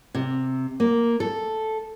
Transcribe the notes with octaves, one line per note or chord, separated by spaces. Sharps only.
C3
A#3
A4